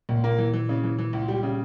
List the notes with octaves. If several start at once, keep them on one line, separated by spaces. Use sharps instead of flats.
C#2 A#2
A#3
E3
E3
C#3
E3
E3
C#2
G3
C#3